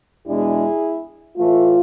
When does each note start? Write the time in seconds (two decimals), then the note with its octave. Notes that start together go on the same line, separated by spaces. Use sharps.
0.26 E2 B2 G#3 D4 E4 G#4
1.37 A2 E3 A3 F4